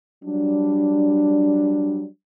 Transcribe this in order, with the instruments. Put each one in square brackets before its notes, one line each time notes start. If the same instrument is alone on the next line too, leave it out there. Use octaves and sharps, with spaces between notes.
[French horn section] F#3 G3 D4